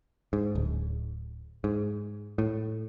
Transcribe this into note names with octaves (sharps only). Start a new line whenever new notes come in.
G#2
D1
G#2
A2